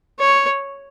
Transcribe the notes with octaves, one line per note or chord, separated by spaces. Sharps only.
C#5